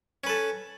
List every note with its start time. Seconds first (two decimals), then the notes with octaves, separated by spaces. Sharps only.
0.24 C#4
0.27 B4
0.29 A4